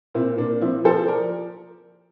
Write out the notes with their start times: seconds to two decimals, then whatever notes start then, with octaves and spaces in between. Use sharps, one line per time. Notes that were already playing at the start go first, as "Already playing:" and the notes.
0.15 A#2 C4 E4
0.37 A#2 A#3 D4
0.61 F3 C4 E4
0.84 F3 A4 C5
1.07 F3 A#4 D5